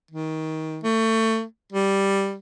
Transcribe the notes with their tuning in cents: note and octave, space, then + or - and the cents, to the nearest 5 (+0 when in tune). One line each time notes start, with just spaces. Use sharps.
D#3 +25
A3 +25
G3 +0